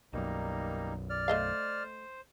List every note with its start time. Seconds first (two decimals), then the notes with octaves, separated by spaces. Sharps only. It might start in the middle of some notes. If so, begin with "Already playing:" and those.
0.13 B1 F#2 G3 A#3 D#4
1.10 D5 F6
1.28 A3 C5 D#5 F5